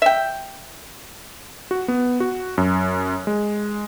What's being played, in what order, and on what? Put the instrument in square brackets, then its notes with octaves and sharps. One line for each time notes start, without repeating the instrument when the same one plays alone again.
[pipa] E5 G5
[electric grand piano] F#4
B3
F#4
F#2
G#3